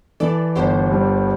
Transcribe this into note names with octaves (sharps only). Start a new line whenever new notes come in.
E3 A4 D5
G1 G4 C5
G3